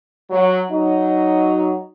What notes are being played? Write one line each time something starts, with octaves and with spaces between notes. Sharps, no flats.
F#3
F#3 D#4